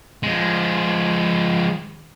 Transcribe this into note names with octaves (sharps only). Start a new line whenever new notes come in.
F3 G#3